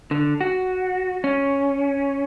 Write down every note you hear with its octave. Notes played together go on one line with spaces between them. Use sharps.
D3
F#4
C#4